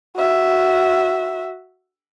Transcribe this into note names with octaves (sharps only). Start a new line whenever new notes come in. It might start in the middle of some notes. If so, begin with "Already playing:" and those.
F#4 E5